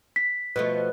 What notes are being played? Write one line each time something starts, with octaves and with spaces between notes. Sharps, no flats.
B6
B2 F3 A3 B4